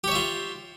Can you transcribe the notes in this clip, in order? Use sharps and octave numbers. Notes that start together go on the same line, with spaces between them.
F4 G4 C#5 E5